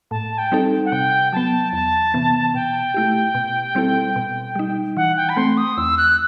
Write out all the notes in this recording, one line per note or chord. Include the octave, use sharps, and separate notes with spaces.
A2 A5
G5
G3 C4 D#4 A4
F#5
C3 G5
F#3 B3 A5
E2 A5
C3 E3 B3
B2 G5
A3 E4 G4
B2
G3 C4 E4 A4
B2
G3 D#4
E3 F#5
G5
B5
A3 C4 C6
D#6
E2 E6
F#6